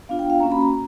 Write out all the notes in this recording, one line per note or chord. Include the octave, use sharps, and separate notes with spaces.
B3 D4 F4 F5
G5
F5
A#3 C#4 F#4 A#5
B5
A#5